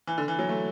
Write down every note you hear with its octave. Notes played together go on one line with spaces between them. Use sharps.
E3
D3
E3
F#3
A3